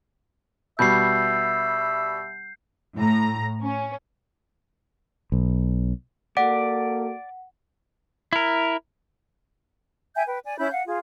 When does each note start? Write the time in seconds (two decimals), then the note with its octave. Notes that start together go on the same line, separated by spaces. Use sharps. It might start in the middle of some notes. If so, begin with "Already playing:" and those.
0.79 B2 G3 E5 G6 C7
2.96 A2 A#5
3.62 C#4
5.32 B1
6.37 A#3 F#4 A4 D5 F#5
8.33 E4 A#4
10.15 E5 G5 G#5 G6
10.27 B4 G5
10.45 D5 G#5
10.58 C#4 E4 B5 G6
10.71 F5 F#5
10.86 F4 G#4